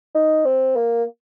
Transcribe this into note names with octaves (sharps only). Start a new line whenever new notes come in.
D#4
C4
A#3